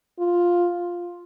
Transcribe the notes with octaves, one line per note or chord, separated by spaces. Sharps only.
F4